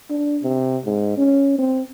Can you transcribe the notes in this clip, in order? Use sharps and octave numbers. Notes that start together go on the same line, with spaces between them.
D4
C3
G#2
C#4
C4